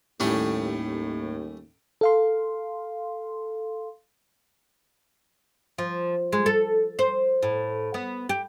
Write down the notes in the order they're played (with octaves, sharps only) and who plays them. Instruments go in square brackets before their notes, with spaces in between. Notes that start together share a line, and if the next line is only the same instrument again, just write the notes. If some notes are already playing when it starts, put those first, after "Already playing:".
[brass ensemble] D#2 [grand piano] A2 [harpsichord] G3 A3 C#4
[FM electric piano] A4 F5 C6
[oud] F3
G#3
A4
C5
A2
B3
G4